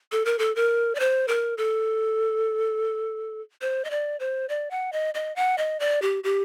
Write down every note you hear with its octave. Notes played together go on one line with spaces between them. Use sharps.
A4
A#4
A4
A#4
D5
C5
A#4
A4
C5
D#5
D5
C5
D5
F#5
D#5
D#5
F#5
D#5
D5
G4
G4